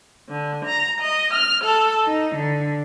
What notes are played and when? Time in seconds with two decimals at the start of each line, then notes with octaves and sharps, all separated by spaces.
0.29 D3
0.65 A#5
1.00 D#5
1.32 F6
1.64 A4
2.06 D#4
2.36 D3